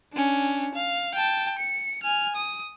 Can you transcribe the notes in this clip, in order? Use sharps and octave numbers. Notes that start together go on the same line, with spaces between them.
C#4 D4
F5
G5 A5
C#7
G#5 F6
D#6